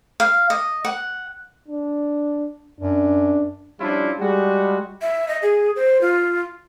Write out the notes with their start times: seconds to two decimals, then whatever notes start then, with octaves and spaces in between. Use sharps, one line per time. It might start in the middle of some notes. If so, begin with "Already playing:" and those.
0.20 F5
0.50 D#5
0.85 F#5
1.68 D4
2.80 F#2 D4
3.80 F3 G3 C#4 D4 E4 F4
4.19 G3 G#3 F#4
5.02 E5
5.28 D#5
5.42 G#4
5.76 C5
6.01 F4